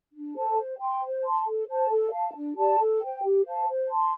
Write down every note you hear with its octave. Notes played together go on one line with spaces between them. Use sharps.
D4
A4 C5 A5
C5
G5 C6
C5
A5 C6
A4
C5 A5
A4
F5 A5
D4
G4 D5 A5
A4
C5 G5
G4
C5 F5 A5
C5
A5 C6